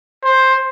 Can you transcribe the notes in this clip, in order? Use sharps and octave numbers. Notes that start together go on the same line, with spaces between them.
C5